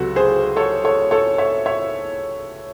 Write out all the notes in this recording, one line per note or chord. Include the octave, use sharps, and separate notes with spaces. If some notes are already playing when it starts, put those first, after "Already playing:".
Already playing: C#2 C3 F#3 F#4 A4
G#4 C5
A4 C#5
A4 C#5
A4 C#5
C#5 E5
C#5 E5